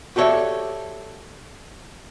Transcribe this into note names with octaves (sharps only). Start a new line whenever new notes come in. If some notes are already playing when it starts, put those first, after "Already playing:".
F#4 G4 A4 C#5 D5 E5